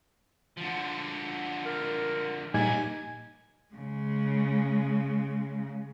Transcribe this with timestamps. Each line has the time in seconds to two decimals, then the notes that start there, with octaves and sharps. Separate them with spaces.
0.57 D3 F3
1.66 A#4
2.54 D#2 A#2 G3 D#4 G#5
3.74 C#3 G#3